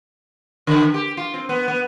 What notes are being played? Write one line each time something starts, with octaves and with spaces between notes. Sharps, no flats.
D3
G4
F4
C4
B3
B3